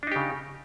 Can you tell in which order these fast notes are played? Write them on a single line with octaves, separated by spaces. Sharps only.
D4 D#4 G4 C#3